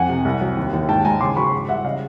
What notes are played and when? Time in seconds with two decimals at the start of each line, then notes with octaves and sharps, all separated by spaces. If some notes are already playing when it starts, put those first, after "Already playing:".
Already playing: F2 F#5 G#5
0.09 C3
0.25 C2
0.41 F#3
0.57 D#2
0.73 D#2
0.88 G#2 G5 A5
1.05 G#2 G#5 A#5
1.21 C#3 C6 D6
1.36 F#3 B5 C#6
1.53 G#2
1.69 G3 E5 F#5
1.84 C#3 D#5 F5